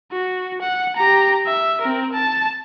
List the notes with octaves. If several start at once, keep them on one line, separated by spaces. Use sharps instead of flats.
F#4
F#5
G4 A#5
E5
C4 A#4
A5